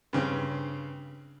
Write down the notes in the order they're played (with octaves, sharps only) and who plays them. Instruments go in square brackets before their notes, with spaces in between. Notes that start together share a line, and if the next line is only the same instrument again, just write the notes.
[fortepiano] G2 C#3 C4